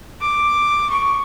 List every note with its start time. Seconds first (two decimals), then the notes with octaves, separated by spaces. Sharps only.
0.21 D6
0.90 C#6